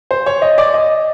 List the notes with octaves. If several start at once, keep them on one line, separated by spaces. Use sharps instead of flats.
C5
C#5
D#5
D5
D#5